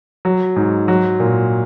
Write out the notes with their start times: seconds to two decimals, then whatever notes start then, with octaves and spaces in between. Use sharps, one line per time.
0.25 F#3
0.56 G#2
0.88 F#3
1.20 A#2